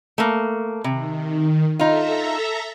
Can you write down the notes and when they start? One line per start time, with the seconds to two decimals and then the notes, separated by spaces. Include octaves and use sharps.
0.18 A3 A#3
0.84 C3 D#3
1.79 D#4 F4 A4 E5 A#5